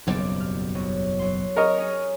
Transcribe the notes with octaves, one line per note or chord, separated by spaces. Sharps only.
F#1 B1 E2 G3 C4 D5
F6
B2 F#3
F#3 C6
A#4 C#5 D#5
C#4 D#4 G#4